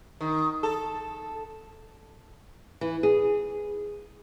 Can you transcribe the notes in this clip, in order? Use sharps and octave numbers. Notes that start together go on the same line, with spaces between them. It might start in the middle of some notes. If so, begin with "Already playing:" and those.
D#3
A4
E3
G#4